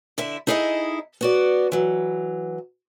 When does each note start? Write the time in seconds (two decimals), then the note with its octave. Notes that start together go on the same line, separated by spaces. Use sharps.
0.18 D3 E4 E5
0.47 D#4 E4 G#4 A4 B4 D#5
1.21 B3 F#4 D5
1.72 E3 F#3